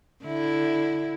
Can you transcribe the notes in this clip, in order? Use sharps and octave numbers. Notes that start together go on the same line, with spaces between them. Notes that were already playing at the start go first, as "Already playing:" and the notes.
D3 E4